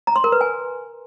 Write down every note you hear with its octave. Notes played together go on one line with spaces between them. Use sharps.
A#5
C6
A#4
B4
G#5